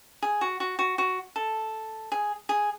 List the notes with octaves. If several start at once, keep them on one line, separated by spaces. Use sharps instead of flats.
G#4
F#4
F#4
F#4
F#4
A4
G#4
G#4